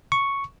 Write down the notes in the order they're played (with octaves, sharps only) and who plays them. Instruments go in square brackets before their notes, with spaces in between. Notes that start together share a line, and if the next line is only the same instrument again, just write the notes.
[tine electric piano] C#6